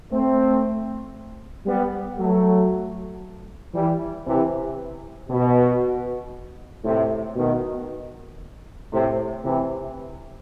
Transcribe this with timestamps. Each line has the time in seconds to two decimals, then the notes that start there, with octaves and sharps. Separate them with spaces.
0.11 A3 C4
1.66 G3 B3
2.19 F#3 A3
3.74 E3 G3
4.26 C3 E3
5.29 B2
6.84 A2 C3
7.36 B2 D#3
8.91 A2 C3
9.44 C3 E3